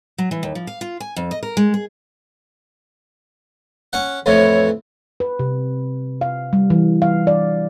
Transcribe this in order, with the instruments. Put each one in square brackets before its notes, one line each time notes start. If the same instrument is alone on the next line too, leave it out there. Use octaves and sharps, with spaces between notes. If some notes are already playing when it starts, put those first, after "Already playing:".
[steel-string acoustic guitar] F#3
E3
D#2
F3
F5
F4
G#5
F2
D#5
A#4
G#3
G#4
[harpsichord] C#4 F#5
[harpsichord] F2 A2 E3 [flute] C#5
[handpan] B4
C3
F5
G3
E3
F5
D5